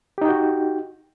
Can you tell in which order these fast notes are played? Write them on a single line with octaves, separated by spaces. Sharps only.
G4 D#4 G5 F#4